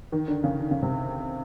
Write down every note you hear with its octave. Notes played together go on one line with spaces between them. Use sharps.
D#3
D3
C#3
D3
C#3
C3